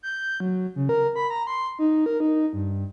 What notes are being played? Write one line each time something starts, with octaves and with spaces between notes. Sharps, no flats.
G6
F#3
C#3
A#4
B5
A#5
C6
D#4
A#4
D#4
G2